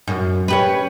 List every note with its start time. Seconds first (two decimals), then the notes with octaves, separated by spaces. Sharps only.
0.07 F#2
0.48 C#4 G4 B4